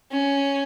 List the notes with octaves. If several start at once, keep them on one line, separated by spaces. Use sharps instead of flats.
C#4